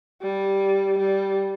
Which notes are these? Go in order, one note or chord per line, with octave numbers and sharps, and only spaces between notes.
G3
G3